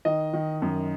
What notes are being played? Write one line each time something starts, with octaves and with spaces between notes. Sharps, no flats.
D#3 D#5
D#3
F#2